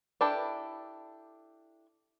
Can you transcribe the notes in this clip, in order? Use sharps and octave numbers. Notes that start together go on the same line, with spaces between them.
D4 E4 G4 A4 B4